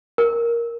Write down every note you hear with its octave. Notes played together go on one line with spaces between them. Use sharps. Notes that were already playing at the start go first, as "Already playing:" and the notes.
A#4